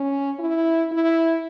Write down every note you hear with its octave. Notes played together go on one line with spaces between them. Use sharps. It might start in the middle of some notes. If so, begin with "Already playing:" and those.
Already playing: C#4
E4
E4